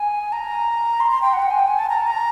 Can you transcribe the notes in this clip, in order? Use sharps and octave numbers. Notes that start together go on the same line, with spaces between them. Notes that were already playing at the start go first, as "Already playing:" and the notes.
Already playing: G#5
A#5
C6
C6
G5
F#5
G5
G#5
G5
G#5
A5
A#5
A5
A#5